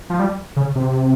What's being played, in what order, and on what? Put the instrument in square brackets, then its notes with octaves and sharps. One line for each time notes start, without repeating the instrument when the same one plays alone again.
[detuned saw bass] F3
G3
C#3
C3